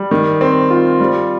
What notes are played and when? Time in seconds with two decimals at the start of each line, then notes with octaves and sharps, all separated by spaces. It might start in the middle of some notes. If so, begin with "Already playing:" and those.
Already playing: G3
0.11 D#3
0.41 C4
0.70 F4
1.00 G3